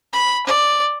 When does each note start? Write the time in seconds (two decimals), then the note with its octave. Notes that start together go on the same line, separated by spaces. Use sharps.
0.13 B5
0.46 D5